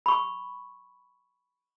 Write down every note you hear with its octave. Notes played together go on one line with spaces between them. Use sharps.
B5 C#6